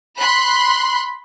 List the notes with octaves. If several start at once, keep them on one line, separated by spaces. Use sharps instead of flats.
B5 C6 F#6